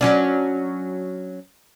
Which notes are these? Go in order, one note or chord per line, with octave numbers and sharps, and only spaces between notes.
F#3 C#4 D4